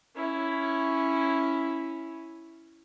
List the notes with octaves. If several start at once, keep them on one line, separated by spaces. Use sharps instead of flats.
C#4 E4